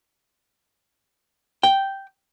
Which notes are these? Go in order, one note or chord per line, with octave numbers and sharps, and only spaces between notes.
G5